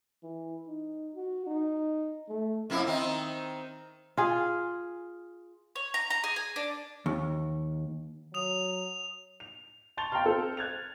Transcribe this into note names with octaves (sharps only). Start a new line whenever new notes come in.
E3
D#4
F#4
D#4
A3
F2 A#3 E4
D#3 C4 D#4
F4 G#4
C#5
A#5
A#5
G#4
G#5
D4
D#2
F#3 D#6 F7
F7
A5 C6 C#6 A6 F7 G7
F5 G5 A5 A#5 C6 F6
C4 A4 C5
F#6 G#6 A6 F7